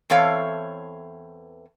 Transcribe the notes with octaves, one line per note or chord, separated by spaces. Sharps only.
E2 E3 C4 A4 C#5 F5